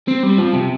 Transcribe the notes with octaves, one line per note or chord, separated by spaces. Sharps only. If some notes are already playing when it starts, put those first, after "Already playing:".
C4
G3
F3
C3